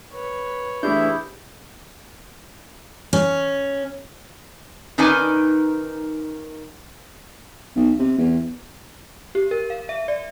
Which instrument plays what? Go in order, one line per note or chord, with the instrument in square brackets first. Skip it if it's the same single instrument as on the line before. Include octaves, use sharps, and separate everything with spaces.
[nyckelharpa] B4 C#5
[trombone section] E3 E4 [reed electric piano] A3 D4 [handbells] G4 G#4 G6
[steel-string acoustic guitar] C#4
[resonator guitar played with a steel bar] D#3 C#4 D#4 B4 D5 G#5
[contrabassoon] B1
C3
E2
[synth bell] G4
A#4
F5
E5
D5